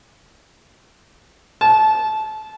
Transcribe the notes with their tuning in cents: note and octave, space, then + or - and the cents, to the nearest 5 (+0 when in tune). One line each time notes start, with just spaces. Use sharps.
A5 -25